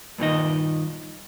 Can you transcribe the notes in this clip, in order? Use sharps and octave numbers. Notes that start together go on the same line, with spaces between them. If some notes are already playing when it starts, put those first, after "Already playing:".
G2 A#2 D#3 D#5